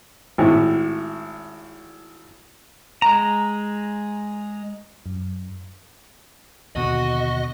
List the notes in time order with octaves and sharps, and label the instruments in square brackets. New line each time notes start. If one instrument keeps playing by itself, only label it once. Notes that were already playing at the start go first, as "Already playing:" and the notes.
[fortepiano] G#1 A2
[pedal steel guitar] G#3 A#5
[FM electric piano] F#2
[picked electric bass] D#2 B2 D3 [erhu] F#4 [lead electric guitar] D#5